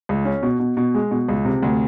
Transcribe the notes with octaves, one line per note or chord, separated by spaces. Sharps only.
C#2
C#4
B2
B2
B2
G#3
B2
C#2
C3
D2